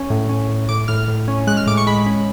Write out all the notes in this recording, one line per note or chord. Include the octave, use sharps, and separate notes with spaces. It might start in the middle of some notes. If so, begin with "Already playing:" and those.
Already playing: C#4
A2
C#4
A2
A2 D6
A2 F6
A2
C#4
G#3 F#6
F6
A2 D6
C#6
G#3 B5
C#4